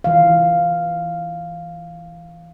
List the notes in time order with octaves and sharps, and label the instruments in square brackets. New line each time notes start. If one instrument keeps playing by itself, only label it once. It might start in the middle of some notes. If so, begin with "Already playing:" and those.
[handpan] E3 F5